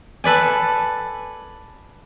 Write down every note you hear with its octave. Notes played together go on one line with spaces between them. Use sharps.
A4 B4 D5 G#5